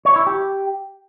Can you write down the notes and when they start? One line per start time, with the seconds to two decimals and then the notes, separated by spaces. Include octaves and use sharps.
0.05 C#5
0.16 E4
0.27 G4